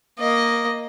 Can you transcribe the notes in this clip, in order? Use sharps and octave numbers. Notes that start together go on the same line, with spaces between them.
A#3 D#5